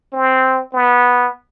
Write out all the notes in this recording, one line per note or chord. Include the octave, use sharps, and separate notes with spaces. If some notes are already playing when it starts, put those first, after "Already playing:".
C4
B3